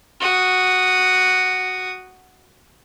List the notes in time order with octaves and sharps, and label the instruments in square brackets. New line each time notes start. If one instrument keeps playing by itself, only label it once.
[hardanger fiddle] F#4 D#6